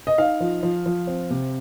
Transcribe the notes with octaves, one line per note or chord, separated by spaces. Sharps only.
D#5
D#4 F5
F3
F3
F3
C4
C3